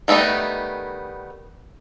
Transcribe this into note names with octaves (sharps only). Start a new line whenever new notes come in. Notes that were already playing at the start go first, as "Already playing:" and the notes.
D#3 G3 A3 B3 D#4